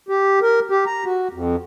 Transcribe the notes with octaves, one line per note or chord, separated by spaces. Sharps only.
G4
A#4
G4
A#5
F#4
F2